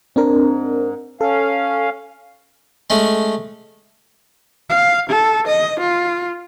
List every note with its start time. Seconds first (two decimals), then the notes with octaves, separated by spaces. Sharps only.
0.16 G#2 C4 D4 A#4
1.21 C#4 A4 F5
2.90 G#3 A3 C#4
4.70 F5
5.10 A4
5.48 D#5
5.80 F4